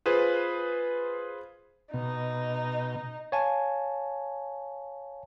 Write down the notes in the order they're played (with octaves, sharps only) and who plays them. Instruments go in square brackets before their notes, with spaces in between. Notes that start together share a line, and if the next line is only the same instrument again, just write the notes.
[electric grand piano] F4 G#4 B4 C5
[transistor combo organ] B2 [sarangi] D#4
[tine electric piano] C#5 F5 G#5 A5